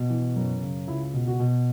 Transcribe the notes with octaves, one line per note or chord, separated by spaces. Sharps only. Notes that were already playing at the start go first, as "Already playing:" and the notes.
Already playing: B2
E3
F#2
C#3
C#2 E4
B2
F#4
B2